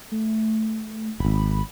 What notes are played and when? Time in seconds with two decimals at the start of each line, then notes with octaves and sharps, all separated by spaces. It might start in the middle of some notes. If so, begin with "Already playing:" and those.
0.12 A3
1.20 D#1 G#1 B5